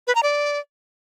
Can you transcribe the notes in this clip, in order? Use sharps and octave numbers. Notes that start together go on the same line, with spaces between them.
B4
A#5
D5